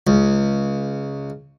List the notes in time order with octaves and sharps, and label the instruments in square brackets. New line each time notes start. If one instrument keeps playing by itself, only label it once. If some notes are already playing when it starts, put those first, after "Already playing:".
[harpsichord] C#2